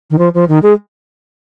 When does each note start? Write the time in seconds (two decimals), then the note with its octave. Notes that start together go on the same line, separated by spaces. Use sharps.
0.11 D#3
0.19 F3
0.34 F3
0.49 D#3
0.63 G#3